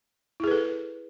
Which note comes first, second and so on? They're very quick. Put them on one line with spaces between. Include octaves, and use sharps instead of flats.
E4 G#4 B4 A4